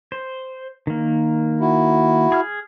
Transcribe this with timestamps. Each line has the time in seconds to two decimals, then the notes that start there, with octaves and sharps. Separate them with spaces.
0.12 C5
0.87 D#3 A#3
1.60 E4 F#4
2.32 G#4 F6